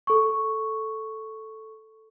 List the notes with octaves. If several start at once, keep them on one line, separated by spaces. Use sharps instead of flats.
A4 C#6